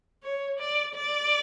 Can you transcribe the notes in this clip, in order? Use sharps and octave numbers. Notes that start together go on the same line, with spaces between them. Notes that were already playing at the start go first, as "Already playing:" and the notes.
C#5
D5
D5